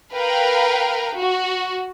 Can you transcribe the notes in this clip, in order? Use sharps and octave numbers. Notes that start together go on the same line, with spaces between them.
A#4 B4 F5 G5
F#4